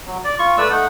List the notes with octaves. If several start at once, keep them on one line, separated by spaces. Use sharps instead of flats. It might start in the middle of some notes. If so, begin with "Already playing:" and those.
F#3
D5
F4 C#6
A3 B4 D5 E6
A3 D#4 F#5